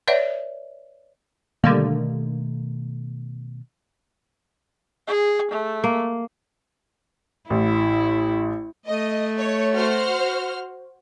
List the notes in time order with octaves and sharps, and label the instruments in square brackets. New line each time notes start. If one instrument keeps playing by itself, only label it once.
[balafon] B4 C#5 D5 E5 F#5
[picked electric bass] B2 D#3 A3 [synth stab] D3 G3 A#3
[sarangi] G#4
A3
[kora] A#3
[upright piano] A1 [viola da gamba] E4
[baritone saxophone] A3 [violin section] D#5
[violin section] C#5
F#4 C5 F6